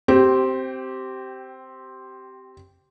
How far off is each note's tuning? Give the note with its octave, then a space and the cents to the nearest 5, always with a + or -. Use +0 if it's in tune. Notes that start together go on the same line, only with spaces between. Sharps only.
C4 +0 G4 -20